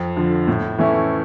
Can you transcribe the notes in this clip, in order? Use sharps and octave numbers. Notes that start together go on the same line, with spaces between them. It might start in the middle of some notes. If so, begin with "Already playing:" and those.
Already playing: F2
D3 F3
A2
E3 A3 C#4 E4